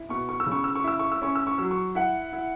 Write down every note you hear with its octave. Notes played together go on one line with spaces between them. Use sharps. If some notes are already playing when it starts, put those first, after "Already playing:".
Already playing: E4
B2 C#6
C#6
E6
C#3
C#6
E6
C#6
E4 E6
C#6
E6
C#4 C#6
E6
C#6
F#3 E6
C#6
E4 F#5
E4